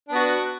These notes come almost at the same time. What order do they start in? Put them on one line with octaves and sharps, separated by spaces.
D4 B3 F#4